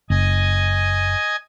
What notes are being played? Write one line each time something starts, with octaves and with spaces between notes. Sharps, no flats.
F#1 D#5 G#5